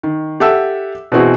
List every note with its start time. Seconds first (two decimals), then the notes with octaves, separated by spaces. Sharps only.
0.03 D#3
0.40 G4 A4 E5 F#5 E6
1.12 B2 E3 C4 F#4 G#4